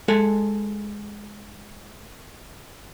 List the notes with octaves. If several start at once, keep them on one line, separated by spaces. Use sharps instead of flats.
G#3 A4 G#5